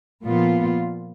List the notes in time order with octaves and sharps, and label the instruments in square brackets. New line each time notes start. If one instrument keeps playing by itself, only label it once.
[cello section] A#2 F3 B3 F4